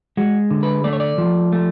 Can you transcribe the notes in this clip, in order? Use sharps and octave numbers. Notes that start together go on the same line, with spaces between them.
G#3 F#4
D3
B4
A3 D5
C#5
D5
F3
A3